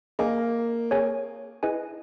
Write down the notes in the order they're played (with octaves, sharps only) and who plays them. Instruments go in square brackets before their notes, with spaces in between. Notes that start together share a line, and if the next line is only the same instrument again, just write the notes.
[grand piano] A#3 [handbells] G#4 D#5 G#5
[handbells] G#4 C#5 G#5
E4 G#4 B4 D#5 G#5